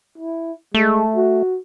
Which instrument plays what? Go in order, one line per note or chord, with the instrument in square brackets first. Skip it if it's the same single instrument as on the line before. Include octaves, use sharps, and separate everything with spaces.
[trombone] E4
[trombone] G#3 [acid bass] A3
[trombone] F#4